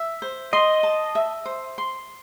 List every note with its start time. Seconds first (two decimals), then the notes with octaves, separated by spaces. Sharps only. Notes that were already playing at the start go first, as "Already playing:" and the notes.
Already playing: E5
0.22 C5
0.53 D#5 C6
0.83 A5
1.15 E5
1.46 C5
1.78 C6